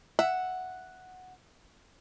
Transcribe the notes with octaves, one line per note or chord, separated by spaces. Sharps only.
E5 F#5